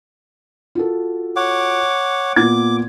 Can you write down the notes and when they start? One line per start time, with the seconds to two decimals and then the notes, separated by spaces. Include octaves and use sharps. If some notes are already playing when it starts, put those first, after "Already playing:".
0.75 F4 F#4 A4
1.36 C#5 F#5 D6
2.36 A#2 B3 D6 G#6